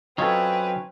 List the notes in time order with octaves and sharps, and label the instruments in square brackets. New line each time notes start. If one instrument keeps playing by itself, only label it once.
[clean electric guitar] F#3 C#4 C#5 [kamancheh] C4 B4 [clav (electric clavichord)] D#4 F4 A4